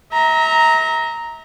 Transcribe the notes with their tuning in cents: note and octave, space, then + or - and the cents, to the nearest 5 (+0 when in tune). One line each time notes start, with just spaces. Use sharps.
E5 -40 A#5 +0